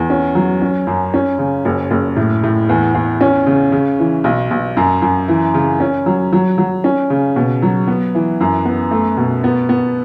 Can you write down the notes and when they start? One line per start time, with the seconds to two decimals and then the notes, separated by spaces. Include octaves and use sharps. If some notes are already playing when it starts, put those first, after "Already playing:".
Already playing: E2
0.10 C#4
0.35 F#3
0.62 C#4
0.87 F#2
1.14 C#4
1.39 C#3
1.65 F#1
1.91 F#1
2.16 A2
2.43 A2
2.69 E2
2.94 E2
3.21 C#4
3.47 C#3
3.72 C#3
3.99 E3
4.24 B1
4.51 B1
4.77 F#2
5.02 F#2
5.28 E3
5.54 C#3
5.80 C#4
6.06 F#3
6.33 F#3
6.58 F#3
6.84 C#4
7.10 C#3
7.36 B2
7.62 F#3
7.87 B3
8.15 E3
8.41 F#2
8.65 B3
8.91 A3
9.17 B2
9.44 B3
9.69 B3